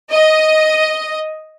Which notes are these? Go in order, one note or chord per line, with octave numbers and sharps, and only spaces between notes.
D#5